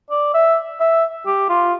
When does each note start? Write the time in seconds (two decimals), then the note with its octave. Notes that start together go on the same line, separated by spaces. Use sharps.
0.10 D5
0.34 E5
0.80 E5
1.26 G4
1.49 F4